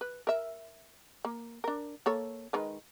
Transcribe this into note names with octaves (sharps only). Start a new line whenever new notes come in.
B4
A#4 E5
A#3
D4 A#4
A#3 A4 C#5
D#3 G#3 B4